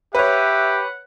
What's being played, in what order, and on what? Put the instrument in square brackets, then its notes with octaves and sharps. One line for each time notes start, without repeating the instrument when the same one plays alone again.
[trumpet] G4 [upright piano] B4 C#5 [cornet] E5 [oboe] F#5